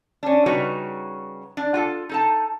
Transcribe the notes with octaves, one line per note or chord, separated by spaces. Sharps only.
C#4 D4
C#3 G3 D#4 F#4 B4 C#5
D4
F4 F#4 A4
D#4 A4 A5